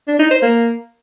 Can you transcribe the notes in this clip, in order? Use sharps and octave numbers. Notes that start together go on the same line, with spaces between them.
D4
D#4
C5
A#3